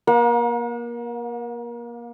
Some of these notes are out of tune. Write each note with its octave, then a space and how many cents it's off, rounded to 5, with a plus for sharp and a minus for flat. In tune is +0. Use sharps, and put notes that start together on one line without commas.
A#3 +30 F#5 -40